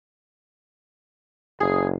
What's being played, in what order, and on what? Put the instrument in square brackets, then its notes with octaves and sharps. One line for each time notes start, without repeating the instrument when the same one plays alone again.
[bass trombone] F#1 [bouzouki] G#4